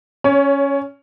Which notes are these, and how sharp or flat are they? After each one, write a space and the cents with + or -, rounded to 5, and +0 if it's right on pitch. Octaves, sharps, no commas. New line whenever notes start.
C#4 +0 C#5 +25